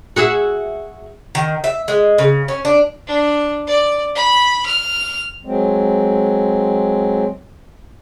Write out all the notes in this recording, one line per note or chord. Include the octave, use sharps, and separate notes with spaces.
F#4 G#4 E5
D#3
E5
G#3
C#3
C#4
D4
D4
D5
B5
F6
F#3 G#3 C4